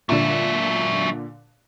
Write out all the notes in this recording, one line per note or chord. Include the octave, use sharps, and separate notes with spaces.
A#2 D3 F#3 E5